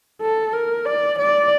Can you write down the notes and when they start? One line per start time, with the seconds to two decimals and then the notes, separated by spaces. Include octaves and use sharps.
0.21 A4
0.53 A#4
0.86 D5
1.18 D5